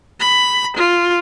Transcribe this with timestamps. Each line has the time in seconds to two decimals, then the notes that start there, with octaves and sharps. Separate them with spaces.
0.20 B5
0.77 F4